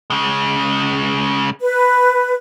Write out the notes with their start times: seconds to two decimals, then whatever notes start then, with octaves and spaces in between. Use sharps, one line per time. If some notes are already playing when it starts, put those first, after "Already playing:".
0.10 C#3 G#3
1.61 B4